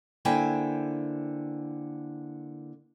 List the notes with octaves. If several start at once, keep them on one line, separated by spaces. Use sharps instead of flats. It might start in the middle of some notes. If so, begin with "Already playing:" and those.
D3 A#3 E4 C5 G5 G#5